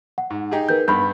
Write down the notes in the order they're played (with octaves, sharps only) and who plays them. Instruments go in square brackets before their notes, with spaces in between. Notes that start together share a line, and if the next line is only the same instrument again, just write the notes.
[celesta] F#5
[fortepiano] G#2
D#4 G4 G#4
[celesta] A#4 B4 G6
[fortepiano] G2 B3 [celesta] B5 G6